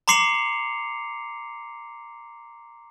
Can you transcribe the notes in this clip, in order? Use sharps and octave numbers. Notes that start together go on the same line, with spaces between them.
A#5 C6 D6 C7 C#7 F7